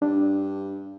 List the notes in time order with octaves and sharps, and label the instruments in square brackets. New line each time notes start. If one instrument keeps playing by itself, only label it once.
[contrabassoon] G2 [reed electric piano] D4